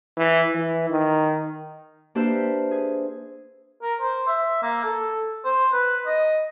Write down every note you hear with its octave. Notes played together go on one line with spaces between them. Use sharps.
E3
E3
D#3
A#3 D4 G4 B4 C5 E5
G#4
A#4
C5
E5
A#3
A4
C5
B4
D#5